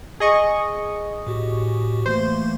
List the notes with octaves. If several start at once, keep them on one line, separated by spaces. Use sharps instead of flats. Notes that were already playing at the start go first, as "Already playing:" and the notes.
G#4 D#5 C#6
A2 F#4 G4
E3 A3 A#3 C5